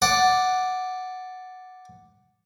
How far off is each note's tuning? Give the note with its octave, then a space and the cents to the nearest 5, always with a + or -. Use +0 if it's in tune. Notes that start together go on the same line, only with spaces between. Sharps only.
D5 +0 F#5 +0